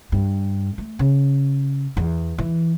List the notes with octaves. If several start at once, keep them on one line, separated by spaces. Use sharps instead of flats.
G2
A3
C#3
E2
E3